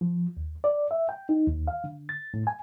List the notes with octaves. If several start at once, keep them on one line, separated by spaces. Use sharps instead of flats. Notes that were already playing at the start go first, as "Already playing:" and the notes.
F3
D#2
D5
E5
G5
D#4
D#2
F5
D3
A6
A2
G#5